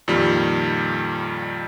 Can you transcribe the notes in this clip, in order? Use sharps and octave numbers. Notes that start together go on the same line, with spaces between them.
F2 A#2 D#3 G3